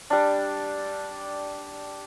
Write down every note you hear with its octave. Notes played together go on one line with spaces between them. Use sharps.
G3 D4